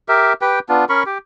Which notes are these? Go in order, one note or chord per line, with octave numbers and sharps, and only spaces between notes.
G4 A#4 E5
G4 B4 G5
B3 D4 F4
C#4 A#4 B5 C#6
G4